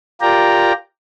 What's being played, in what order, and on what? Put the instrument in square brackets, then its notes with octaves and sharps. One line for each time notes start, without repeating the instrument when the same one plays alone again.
[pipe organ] F4 G4 A#4 D5 G5 A#5